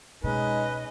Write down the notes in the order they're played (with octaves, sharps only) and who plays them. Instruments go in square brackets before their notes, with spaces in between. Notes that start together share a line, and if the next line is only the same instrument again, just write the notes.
[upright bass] B2 [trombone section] G#3 D#4 [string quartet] C#4 D#5 [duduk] B4